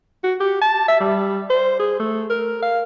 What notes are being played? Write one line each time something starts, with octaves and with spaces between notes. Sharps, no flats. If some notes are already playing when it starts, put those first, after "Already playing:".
F#4
G4
A5
E5
G3
C5
G#4
A3
A#4
F5